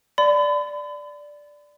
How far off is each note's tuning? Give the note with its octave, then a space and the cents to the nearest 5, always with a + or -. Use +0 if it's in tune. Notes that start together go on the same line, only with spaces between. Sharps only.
D5 +0 B5 +40